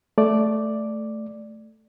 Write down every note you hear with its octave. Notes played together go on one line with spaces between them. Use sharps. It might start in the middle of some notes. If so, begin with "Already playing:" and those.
A3 D5